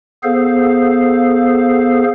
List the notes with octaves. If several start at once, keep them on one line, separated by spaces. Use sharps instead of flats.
B3 G#4 A4 C5 F5